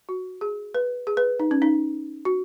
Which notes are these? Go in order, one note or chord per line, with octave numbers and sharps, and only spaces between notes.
F#4
G#4
B4
G#4
B4
D#4
C#4
D#4
F#4